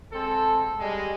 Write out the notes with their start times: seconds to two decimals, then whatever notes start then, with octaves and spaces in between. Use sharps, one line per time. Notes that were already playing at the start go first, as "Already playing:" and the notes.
0.13 G#3 C4 A4
0.80 G3 G#3